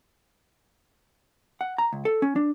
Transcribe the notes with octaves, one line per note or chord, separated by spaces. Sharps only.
F#5
A#5
C#2
A4
C#4
D4